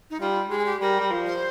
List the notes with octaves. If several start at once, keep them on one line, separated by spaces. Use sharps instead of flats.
D#4
G3 F4
G#3 G4
G#4
G4
G3 A#4
G3
F3
C5